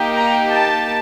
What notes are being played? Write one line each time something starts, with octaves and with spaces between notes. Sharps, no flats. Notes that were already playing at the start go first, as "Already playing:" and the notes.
Already playing: A#3 D#4 G4
A#5
A5